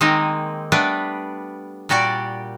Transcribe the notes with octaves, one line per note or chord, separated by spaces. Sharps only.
D#3 G#3 A#3 C4 D#4
G3 A3 B3 D4 B4
A#2 G3 F#4 G4 D5